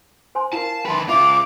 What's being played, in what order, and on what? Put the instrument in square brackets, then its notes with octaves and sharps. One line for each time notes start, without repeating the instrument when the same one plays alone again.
[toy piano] C5 G#5 C6
[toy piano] E4 A#4 [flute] F5 [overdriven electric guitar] A5
[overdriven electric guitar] D#3 B4 [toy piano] G5 C6 [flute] A5
[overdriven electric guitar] C#3 F4 [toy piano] E5 [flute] D6